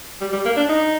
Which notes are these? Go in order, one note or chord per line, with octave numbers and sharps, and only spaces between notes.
G3
G3
A#3
D4
D#4